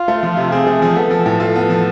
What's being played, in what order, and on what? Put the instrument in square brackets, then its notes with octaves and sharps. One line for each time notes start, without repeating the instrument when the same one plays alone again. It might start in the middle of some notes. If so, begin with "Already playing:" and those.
Already playing: [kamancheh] F4
[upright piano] A3
F3
C3
[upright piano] C4 [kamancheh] G#4
[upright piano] A3
F3
[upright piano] B3 [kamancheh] A4
[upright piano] F3
A2
[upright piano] F4 [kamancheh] A4
[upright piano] B3
F3